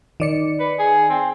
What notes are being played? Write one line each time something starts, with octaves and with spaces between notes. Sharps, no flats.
D#3 D5 C#7
B4
G#4
C4